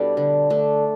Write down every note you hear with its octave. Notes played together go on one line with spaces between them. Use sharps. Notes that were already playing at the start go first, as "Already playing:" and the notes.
Already playing: B2 G3 D4 E4 A4 B4
D3
A3 D4